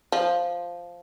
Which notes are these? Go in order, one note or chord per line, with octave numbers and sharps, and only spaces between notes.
F3